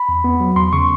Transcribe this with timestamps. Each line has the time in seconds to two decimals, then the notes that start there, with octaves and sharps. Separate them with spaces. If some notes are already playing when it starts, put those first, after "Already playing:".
Already playing: B5
0.09 E2
0.24 B3
0.40 F#3
0.56 E2 C6
0.73 C#3 C#6